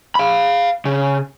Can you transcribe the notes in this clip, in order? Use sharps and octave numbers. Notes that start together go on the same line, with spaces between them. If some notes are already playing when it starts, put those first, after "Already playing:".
F5 B5
C#3